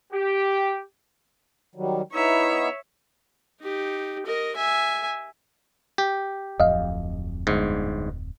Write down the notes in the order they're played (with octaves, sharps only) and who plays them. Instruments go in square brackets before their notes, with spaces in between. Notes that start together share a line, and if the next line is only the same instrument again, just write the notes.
[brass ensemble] G4
[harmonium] D#3 F#3 G3
[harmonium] B3 D#4 E4 [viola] C#5 E5
[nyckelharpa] D#4 G4
A#4 D#5
E5 G#5
[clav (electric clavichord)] G4
[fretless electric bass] D1 F2 [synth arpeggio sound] D#5 F5
[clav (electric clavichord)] G1 G#2